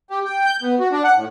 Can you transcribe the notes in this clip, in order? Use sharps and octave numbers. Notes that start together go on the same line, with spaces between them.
G4
G5
G6
B3
F#4
D4
F#5
A2